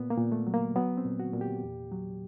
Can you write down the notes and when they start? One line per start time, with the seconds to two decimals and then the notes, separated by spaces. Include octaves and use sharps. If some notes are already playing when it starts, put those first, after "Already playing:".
Already playing: A#2 B3
0.10 A#3
0.18 A#2
0.32 A3
0.47 F#3
0.54 A#3
0.76 F#3 B3
0.97 C4
1.05 A#2
1.20 F#4
1.34 A#2
1.41 G4
1.63 E2
1.91 F#3